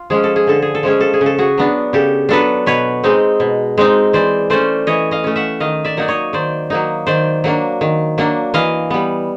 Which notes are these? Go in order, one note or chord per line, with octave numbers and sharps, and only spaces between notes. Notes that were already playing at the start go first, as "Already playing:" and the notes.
Already playing: F4
F3 G#3 C#4 G#4
A4
G#4
D3 A4
G#4
A4
F3 G#3 C#4 G#4
A4
G#4
C#3
A4
F#4 G#4
F#3 B3 D4
C#3 G4 A4
F#3 B3 D4 A4 B4
B2 B4 C#5
G#3 C4 D#4
B2
G#3 C4 D#4
E3 C5 D5
A3 C#4 C5 D5
E3 C#5 D#5
D#5 F5
A3 C#4
E5 F#5
D#3 D#5 F5
D5 E5
F#3 A#3 D#4 D5
C#5 D#5
D#3 C5 D5
F#3 A#3 D#4
D#3 C5 D5
F#3 A#3 D4
D#3
F#3 A#3 D4
E3 D#5 F5
G3 B3